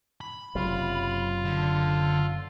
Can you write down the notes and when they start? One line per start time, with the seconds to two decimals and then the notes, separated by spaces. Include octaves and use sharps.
0.21 B5
0.55 F#1 C3 F#3 F4
1.45 D3